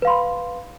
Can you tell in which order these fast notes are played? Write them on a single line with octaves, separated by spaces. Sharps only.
B4 F5 C6 B5